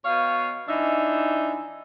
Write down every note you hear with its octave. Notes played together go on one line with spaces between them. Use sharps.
B2 C#5 F5
E3 D4 D#4 E5